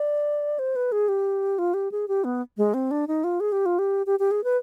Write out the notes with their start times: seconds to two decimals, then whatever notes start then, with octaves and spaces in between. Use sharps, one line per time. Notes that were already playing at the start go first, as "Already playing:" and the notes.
Already playing: D5
0.59 C5
0.76 B4
0.92 G#4
1.09 G4
1.59 F4
1.74 G4
1.92 G#4
2.08 G4
2.24 B3
2.57 G#3
2.74 C4
2.91 D4
3.08 D#4
3.24 F4
3.40 G#4
3.52 G4
3.66 F4
3.79 G4
4.06 G4
4.19 G4
4.31 G#4
4.44 B4